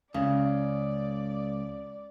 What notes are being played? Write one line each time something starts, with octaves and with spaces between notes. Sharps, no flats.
C#2 C#3 D5